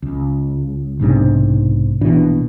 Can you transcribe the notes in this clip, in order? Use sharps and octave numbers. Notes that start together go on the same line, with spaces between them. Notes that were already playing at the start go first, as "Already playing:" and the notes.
C#2
B1 G#2 C3 D4
A#1 B2 E3 D4